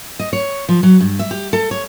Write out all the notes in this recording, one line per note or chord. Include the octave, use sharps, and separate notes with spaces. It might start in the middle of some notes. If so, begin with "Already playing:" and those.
D#5
C#5
F3
F#3
G2
E5
G4
A4
C#5